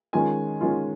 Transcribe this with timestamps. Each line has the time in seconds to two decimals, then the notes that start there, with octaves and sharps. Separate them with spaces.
0.13 D#3 G#3 C#4 F4 G#5
0.61 D#3 G#3 C#4 F4